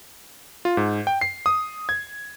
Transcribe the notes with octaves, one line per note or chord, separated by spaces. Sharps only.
F4
G#2
G5
C7
D#6
G#6